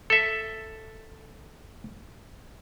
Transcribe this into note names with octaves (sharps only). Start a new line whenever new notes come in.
A4 E5